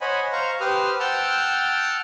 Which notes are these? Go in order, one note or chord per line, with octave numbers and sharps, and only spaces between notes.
C5 C#5 D#5 F#5 G#5 B5
C5 F5 A#5 C#6
G4 B4 C5 D#6 F6
F#5 G5 A5 E6 F6 G6